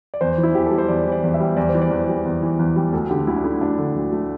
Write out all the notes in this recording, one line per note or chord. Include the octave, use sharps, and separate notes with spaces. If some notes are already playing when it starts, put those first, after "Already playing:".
D5
E2 C5
E3
E4
E2 G4
A4
G3
C5
E2 D5
E3
D5
E2
E5
G3
E2 D5
C5
E3
D5
E2
G3
E2
E3
E2
G3
D2 A4
D3 G4
D2 E4
D4
A3 E4
D2 D4
D3
D2
A3